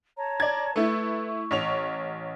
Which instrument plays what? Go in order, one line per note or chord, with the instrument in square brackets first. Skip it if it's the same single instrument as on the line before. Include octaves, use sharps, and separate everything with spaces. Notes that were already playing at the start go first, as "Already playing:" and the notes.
[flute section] C#5 A5 A#5
[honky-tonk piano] D5 G#6
[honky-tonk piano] A3 E4 [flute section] B4 D5 C#6
[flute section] C#6
[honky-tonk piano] A1 C#5 F7